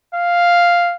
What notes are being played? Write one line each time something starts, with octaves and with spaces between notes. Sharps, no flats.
F5